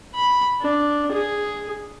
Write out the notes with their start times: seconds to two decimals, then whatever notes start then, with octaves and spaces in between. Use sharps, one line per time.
0.15 B5
0.61 D4
1.12 G#4